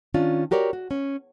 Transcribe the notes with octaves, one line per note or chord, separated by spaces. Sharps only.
D#3 C#4 D4 F4
F#4 G4 A#4 C#5 D5
F#4
C#4